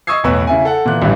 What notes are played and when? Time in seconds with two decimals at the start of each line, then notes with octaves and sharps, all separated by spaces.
0.07 D#5 C#6 D#6 E6 G#6 C7
0.24 B1 E2 A2 B4 C#5 E6
0.47 C#3 E4 G#5
0.65 A4 F#5
0.85 A#2 E3 F#6
1.02 A1 G2 E3